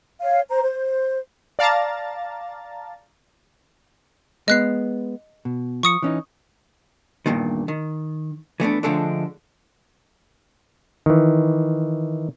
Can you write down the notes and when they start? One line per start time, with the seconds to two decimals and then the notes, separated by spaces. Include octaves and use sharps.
0.21 C#5 F5
0.49 C5 A#5
0.62 C5
1.59 D5 F5 A5 A#5 A6
4.48 G#3 B3 D#5 F#6 C7
5.45 B2
5.83 F3 C#6 D#6 C#7
6.02 E3 C#4 D#4
7.26 E2 G2 A#2 D#3
7.68 D#3
8.60 E3 A3 B3 D4
8.83 D3 F3 G#3 A3 D4
11.06 D#3 E3